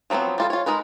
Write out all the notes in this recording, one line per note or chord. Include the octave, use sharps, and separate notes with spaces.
F3 F#3 A3 B3 C4
G3 F4 A4
F4 C#5
G#3 D#4 A#4 B4